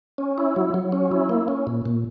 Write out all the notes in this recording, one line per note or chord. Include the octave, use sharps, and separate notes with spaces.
C#4
E4
F#3
F#3
C#4
E4
A#3
C#4
A#2
A#2